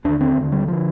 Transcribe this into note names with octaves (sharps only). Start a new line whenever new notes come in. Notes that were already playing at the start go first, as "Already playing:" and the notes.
D#2 D3 D4
C4
D#2 D3
G3
D3 F3